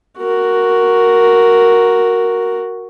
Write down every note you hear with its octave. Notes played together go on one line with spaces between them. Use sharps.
F#4 A#4